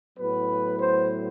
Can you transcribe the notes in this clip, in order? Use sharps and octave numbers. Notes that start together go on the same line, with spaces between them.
A2 F#3 B3 B4
C5